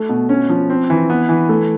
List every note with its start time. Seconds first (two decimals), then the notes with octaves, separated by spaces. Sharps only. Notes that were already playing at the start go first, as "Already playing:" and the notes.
Already playing: A3
0.09 B2
0.29 C#4
0.49 F3
0.70 C4
0.90 E3
1.10 B3
1.29 E3
1.49 A3